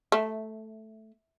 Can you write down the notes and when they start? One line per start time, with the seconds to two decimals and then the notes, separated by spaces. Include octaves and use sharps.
0.12 A3